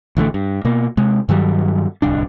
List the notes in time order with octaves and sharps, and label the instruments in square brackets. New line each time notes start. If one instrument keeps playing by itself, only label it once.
[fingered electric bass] A1 D3 D#3 A3
G2
B2 A#3
C3 G#3
G2 D#3 F#3 G3
D1 C2 D4